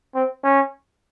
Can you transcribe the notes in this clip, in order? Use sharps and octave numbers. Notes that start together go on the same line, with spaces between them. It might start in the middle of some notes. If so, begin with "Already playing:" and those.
C4
C#4